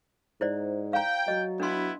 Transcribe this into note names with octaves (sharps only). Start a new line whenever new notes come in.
G#2 E4 C5 D5
F5 G5 A#5
F#3 D#5
B3 D4 E4 C6